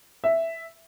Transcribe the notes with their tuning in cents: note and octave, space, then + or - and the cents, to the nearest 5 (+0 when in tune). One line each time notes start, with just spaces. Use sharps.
E5 +0